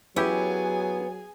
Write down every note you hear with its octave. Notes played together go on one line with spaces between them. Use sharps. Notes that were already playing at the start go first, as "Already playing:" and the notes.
F#3 B3 C#4 E4 G4 G#4 G#5